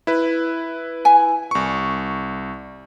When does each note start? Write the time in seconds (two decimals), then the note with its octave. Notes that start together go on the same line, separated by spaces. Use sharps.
0.07 E4 B4
1.05 G#5
1.51 C2 C#6